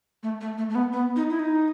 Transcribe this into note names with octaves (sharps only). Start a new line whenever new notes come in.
A3
A3
A3
A3
B3
B3
D#4
E4
D#4